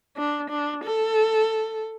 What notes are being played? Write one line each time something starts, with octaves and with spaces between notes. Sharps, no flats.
D4
D4
A4